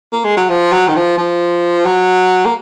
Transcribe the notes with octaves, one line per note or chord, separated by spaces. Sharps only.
A#3
G#3
F#3
F3
F#3
D#3
F3
F3
F#3
A#3